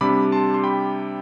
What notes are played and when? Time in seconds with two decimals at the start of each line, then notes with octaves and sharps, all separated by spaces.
0.01 C3 G3 D4 B5 D6
0.32 A5 C6
0.54 C6
0.64 G5 B5